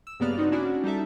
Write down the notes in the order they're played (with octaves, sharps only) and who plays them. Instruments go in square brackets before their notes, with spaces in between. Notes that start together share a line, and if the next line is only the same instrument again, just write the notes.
[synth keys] E6
G2 C#3 A#3 B3 D5 F6
B3 C4 D4 D#4 F#4
C#4 D4 E4 F#4 D5
G3 D#4 A4 E5